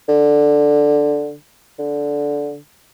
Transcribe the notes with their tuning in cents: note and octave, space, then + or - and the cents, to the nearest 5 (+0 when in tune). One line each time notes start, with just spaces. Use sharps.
D3 +0
D3 -15